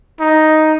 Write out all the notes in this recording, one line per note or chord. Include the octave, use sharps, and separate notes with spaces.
D#4